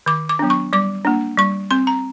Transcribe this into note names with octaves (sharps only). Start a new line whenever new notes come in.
D#3 D6
D6
F#3 B3 D4
C#6
G3 D6
A#3 D4
G3 C#6
C4 C6
A#5